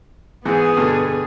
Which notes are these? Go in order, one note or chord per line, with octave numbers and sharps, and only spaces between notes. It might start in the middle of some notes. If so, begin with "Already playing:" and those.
G#2 E3 B3 G#4
G2 B2 D3